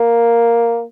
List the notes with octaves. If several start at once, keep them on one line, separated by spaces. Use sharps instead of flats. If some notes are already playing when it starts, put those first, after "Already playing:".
Already playing: A#3